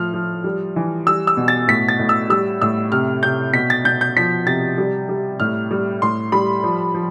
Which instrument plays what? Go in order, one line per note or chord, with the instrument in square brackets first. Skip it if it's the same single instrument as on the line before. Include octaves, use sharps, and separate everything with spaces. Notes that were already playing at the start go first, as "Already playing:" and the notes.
Already playing: [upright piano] A2 F3 F6
F3
G3
E3
G3 E6
E6
B2
A6
A2 B6
A6
A2
E6
G3 E6
A2 E6
C3 F6
C3 G6
B2 B6
A6
B2 G6
G6
F3 B6
C3 A6
G3
G3
A2 F6
G3
A2 C6
G3 B5
F3
F3